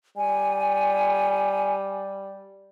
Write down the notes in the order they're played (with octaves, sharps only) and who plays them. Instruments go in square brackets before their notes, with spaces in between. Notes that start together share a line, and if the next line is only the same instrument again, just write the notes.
[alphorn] G3 [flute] G#5